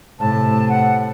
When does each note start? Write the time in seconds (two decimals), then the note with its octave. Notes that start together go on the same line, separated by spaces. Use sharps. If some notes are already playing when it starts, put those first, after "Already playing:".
0.20 A2 C3 A5
0.69 F#5